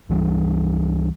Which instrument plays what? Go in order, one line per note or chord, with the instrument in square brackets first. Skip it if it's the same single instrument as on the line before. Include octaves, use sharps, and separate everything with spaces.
[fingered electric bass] C#2 E3 G3